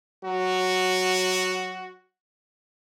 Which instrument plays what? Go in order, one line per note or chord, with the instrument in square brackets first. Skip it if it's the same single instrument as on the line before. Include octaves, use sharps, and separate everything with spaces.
[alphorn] F#3 [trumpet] F#4